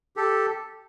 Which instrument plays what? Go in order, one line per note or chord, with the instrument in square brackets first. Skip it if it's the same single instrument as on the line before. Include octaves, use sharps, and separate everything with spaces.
[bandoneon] G4 A4